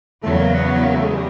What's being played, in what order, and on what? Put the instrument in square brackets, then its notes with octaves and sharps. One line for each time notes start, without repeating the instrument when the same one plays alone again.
[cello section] E2 C#3 F#3 [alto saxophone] A3
[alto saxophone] A#3
B3
A#3
A3
G#3
G3